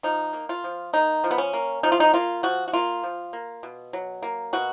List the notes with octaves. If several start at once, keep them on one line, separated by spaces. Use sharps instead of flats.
F3 D#4
A#3
F4
F3
A#3 D#4
F3
B3
C#4
A#3
F3 D#4
F4
D#4
A#3 F4
F3 F#4
F#4
A#3 F4
F3
A#3
B2
F#3
A#3
B2 F#4